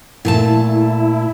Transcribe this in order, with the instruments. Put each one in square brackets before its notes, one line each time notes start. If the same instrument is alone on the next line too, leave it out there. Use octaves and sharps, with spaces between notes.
[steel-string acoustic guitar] A#2 A3 A5 [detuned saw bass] E4